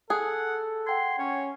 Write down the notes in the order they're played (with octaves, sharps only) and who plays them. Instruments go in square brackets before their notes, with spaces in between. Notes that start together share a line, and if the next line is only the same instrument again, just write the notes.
[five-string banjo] G#4 [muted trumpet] A4 [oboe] F#5
[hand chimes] F#5 G5 G#6 [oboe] C6
[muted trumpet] C#4 [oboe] C#5